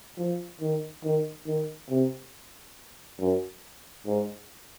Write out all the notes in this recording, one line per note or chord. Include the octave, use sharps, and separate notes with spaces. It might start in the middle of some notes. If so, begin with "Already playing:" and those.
F3
D#3
D#3
D#3
C3
F#2
G#2